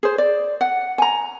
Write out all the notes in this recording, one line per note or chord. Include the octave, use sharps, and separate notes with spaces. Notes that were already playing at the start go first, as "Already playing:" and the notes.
G#4 C5
D5
F#5
G#5 A#5